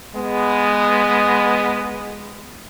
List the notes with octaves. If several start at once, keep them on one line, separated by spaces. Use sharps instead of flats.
G#3 B3